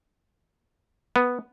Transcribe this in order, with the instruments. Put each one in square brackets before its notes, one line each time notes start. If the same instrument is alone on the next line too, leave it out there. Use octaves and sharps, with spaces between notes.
[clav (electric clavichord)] B3